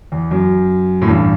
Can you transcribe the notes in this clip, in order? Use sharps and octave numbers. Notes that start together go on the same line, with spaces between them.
E2
F#2
A2
E2 G2